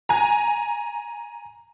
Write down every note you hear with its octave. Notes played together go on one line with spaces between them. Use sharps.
G#5 A#5